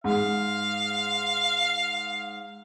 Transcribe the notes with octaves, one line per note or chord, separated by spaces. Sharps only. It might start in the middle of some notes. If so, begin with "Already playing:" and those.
G#2 F5